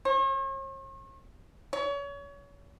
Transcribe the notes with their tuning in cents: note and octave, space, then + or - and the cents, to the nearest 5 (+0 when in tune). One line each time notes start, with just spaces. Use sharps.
C#5 -45
C#5 +30